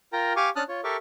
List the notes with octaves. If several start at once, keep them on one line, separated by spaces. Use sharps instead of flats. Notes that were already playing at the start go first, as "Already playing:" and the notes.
F4 A#4 G5 A#5
G4 F5 G#5 C#6 D6
C#4 D4 A5 D#6 F6 F#6
F4 C#5
G4 A4 A#4 E5 C#6 D6